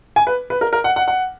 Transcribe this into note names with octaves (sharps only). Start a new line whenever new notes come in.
G#5
B4
B4
A#4
A#4
F#5
F#5
F#5